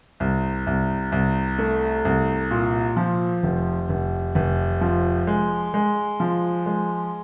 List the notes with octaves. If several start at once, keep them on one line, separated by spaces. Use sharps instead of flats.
C2
C2
C2
A3
C2
A#2
F3
F1
F1
F1
F3
G#3
G#3
F3
G#3